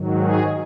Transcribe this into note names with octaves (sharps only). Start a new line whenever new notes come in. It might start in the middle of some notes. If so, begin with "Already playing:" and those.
Already playing: G#2 D#3 F#3
G#3 G#4